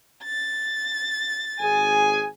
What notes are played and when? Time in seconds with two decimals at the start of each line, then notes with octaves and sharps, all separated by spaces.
0.24 A6
1.59 G#1 G#4 G#5